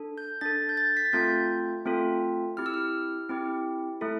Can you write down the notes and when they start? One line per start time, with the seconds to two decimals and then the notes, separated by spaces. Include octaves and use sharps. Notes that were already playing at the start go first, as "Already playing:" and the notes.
Already playing: D4 A4
0.18 G6
0.41 D4 A4 A6
0.69 G6
0.77 A6
0.97 B6
1.05 A6
1.13 A3 C4 F4 A4 G6
1.85 A3 C4 F4 A4
2.57 C4 E4 G4 F6
2.66 E6
2.74 F6
3.29 C4 E4 G4
4.01 A3 E4 A4